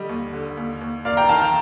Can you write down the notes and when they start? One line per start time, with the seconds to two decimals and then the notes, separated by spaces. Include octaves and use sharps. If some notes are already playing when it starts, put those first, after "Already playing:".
Already playing: D3 G3 D#5
0.09 D#2
0.33 D3
0.57 D#2
0.81 D#2
1.05 A#3 D5 F5
1.17 G5 A#5
1.29 D#3 F5 A5
1.41 G5 A#5